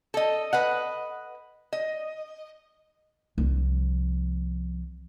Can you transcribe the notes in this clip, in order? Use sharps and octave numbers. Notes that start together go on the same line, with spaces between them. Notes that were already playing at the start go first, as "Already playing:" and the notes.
A4 D#5
B4 D#5 F#5
D#5
C2 F3